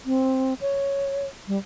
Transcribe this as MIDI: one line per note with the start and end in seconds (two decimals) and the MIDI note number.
0.06 0.54 60
0.61 1.26 73
1.48 1.58 55